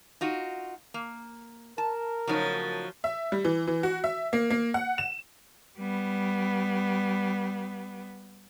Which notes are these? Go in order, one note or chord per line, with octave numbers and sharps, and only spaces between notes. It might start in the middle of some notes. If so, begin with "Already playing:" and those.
D#4 F4 F#4
A#3
A#4 A5
C#3 F3 F#3 A3 D#4
E5
G3
E3
E3
F#4
E5
A#3
A#3
F#5
E7
G3 B3